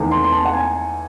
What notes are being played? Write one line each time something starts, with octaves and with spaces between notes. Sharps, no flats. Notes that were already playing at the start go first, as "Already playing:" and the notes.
Already playing: E2 D#3 A3
C6
C6
A5
F#5
G#5